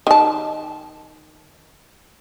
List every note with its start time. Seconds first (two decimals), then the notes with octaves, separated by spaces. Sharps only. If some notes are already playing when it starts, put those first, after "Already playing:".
0.07 D#3 A5